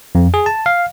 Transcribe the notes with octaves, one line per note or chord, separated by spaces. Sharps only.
F2
G#4
A5
F5